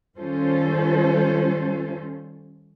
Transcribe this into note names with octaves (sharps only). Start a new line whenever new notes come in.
D#3 G3 C#4 F4 A4 C5